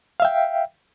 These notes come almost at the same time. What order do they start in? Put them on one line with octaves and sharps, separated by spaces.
F5 E5 G5